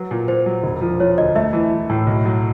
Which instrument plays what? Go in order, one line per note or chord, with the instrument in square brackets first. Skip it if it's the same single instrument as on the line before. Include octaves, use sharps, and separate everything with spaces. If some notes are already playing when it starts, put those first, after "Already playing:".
Already playing: [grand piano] F#3 [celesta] B4
[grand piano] A#2
[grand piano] A#2 [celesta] C5
[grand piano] F#3
E1
F3
[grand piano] F3 [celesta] C#5
[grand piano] D2 [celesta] D#5
[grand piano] A3 [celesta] E5
[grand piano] E3
E3
A2
B1
F#3